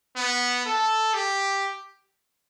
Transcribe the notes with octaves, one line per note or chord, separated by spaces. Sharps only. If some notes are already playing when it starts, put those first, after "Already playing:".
B3
A4
G4